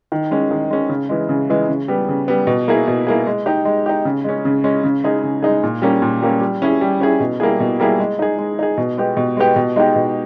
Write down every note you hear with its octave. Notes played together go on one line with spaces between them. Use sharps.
D#3
G#3 C#4
D#3
G#3 C#4
C#3
E3 G#3
C#3
E3 G#3
C#3
G3 B3
C#3
G3 B3
B2
A#3 E4 G#4
B2
A#3 E4 G#4
G#3
D#4 G4
G#3
D#4 G4
C#3
G#3 C#4
C#3
G#3 C#4
C#3
G#3 D#4 G#4
C#3
G#3 D#4 G#4
A#2
G3 A#3 C#4
A#2
G3 A#3 C#4
G3
C#4 E4 G#4
G3
C#4 E4 G#4
B2
G3 A#3 E4 G#4
B2
G3 A#3 E4 G#4
G#3
D#4 G#4
G#3
D#4 G#4
B2
G#3 B3 G4
B2
G#3 B3 G4
B2
G#3 D#4 G4
B2